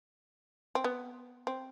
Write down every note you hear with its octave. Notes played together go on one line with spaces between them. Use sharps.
C4
B3
C4